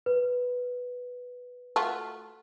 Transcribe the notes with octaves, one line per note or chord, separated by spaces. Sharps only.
B4
A3 F4 F#4